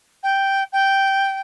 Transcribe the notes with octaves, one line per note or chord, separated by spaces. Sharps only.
G5
G5